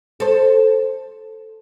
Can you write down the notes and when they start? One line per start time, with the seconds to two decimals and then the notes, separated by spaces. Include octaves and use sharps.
0.20 A4 C5